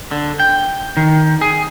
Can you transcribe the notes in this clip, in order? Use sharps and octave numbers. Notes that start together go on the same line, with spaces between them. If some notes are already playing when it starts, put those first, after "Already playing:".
D3
G5
D#3
G#4